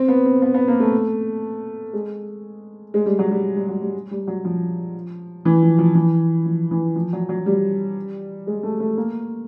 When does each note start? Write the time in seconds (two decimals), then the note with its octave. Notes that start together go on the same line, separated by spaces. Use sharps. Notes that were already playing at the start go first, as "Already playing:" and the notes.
Already playing: C4
0.08 B3
0.26 C4
0.42 B3
0.54 B3
0.68 A#3
0.80 A3
1.93 G#3
2.94 G#3
3.06 G3
3.19 F#3
3.31 G3
3.57 G3
3.69 F#3
3.81 G3
4.11 G3
4.27 F#3
4.45 F3
5.45 E3
5.62 F3
5.79 F3
5.95 E3
6.46 F3
6.71 E3
6.96 F3
7.13 F#3
7.29 F#3
7.46 G3
8.47 G#3
8.63 A3
8.80 A3
8.97 A#3